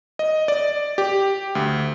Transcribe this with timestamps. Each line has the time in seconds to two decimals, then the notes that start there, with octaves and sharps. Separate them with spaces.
0.19 D#5
0.48 D5
0.98 G4
1.55 D2